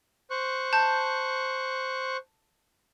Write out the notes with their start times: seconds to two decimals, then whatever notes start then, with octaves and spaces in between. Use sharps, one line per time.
0.30 C5 C#6 F#6
0.73 A5 G6